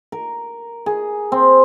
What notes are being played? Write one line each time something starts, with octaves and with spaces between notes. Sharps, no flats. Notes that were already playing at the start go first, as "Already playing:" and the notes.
A#4
G#4
C4